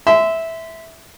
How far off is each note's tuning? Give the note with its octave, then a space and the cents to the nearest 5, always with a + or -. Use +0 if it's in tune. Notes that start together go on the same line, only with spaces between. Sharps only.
E5 -10 C6 -30